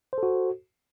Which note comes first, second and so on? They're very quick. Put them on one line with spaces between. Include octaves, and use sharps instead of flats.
C5 A4 F#4